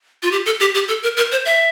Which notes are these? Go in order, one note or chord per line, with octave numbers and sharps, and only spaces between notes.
F4
G4
A4
G4
G4
A4
A#4
A#4
C5
E5